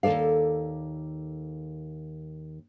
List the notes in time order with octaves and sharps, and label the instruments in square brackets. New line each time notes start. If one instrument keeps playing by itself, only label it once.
[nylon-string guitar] D#2 C3 A4 D5 F5